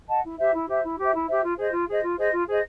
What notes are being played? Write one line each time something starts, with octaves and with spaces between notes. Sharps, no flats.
D#5 F#5 A5
E4
G4 C5 E5
E4
G4 C5 E5
E4
G4 C5 E5
E4
G4 C5 E5
F4
G#4 C5 D#5
F4
G#4 C5 D#5
F4
G#4 C5 D#5
F4
G#4 C5 D#5